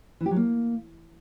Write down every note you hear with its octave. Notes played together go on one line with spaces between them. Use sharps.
E3
G4
F#3
A#3